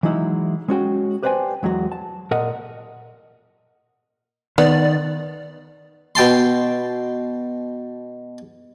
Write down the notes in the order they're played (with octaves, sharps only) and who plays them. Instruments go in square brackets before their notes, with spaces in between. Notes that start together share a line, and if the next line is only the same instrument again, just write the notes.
[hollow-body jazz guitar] E3 F#3 G#3 D#4 E4
G#3 C#4 F#4 G5
G4 B4 C5 D5 G5 G#5
E2 F#3 G#3 F#4
A5
A#2 A#4 D#5 F#5
[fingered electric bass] D#3 [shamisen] B3 [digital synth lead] D5
[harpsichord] B2 G5 A5 C6